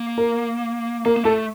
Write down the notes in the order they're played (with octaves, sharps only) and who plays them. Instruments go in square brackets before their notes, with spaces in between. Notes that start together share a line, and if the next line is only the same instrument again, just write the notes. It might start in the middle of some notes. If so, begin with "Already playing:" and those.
Already playing: [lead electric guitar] A#3
[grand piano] A#4
[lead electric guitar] A#3 [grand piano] A#4
[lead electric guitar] A#3
[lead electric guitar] A3 [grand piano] A4